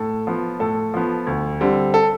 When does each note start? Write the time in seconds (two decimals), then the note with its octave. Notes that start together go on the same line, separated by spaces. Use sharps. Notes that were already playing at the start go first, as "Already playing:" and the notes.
Already playing: A2 A4
0.27 F3 B3
0.60 A2 A4
0.94 F3 B3
1.27 D2
1.61 D3 G3 C4
1.94 A4